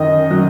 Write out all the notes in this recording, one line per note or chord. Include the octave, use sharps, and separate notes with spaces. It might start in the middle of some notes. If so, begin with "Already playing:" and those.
Already playing: F#2 D#3 D#5
F#3